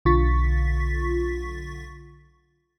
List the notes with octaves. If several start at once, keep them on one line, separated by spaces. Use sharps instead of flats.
B1 D3 F4 C#6 A6 B6